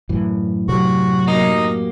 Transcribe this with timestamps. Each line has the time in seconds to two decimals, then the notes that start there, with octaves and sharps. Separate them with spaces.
0.09 F#2 A2 E3
0.69 C3 F#3 F#4
1.27 A#3 D#4 F#4 G4